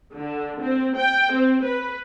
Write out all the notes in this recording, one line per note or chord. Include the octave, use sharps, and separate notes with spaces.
D3
C4
G5
C4
B4